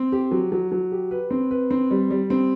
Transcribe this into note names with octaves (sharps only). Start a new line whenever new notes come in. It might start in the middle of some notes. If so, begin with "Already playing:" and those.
Already playing: C4
G4
F#3
F#3
F#3
G4
B4
C4
B4
C4
G3
G3
C4